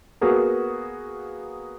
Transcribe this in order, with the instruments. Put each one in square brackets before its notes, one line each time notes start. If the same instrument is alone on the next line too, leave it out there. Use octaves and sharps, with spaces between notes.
[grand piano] A#3 B3 F#4 G#4 A#4